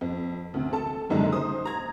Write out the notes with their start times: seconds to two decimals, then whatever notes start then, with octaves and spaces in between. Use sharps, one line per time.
0.01 F2
0.54 D2 C3
0.73 A4 A5
1.10 F#1 C2 F#2 D3 G#3 D#4
1.32 C5 D#6
1.65 A#5 G#6